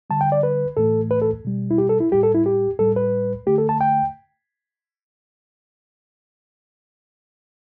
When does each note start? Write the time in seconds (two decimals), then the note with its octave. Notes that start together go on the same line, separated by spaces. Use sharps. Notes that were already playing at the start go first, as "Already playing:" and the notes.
0.10 D3 G3 A5
0.21 G5
0.32 D5
0.43 B4
0.77 A2 E3 A3 A4
1.11 B4
1.22 A4
1.45 B2 G3
1.71 E4
1.78 G4
1.89 A4
2.00 E4
2.12 A2 G3 G4
2.23 A4
2.35 E4
2.46 G4
2.79 A2 G3 A4
2.96 B4
3.47 D3 A3 G4
3.58 A4
3.69 A5
3.81 G5